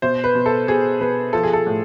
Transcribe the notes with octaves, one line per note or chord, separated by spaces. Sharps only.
B2 C5
B4
B2
A4
B2 G#4
B2 B4
F3 A4
G#4
A4
A2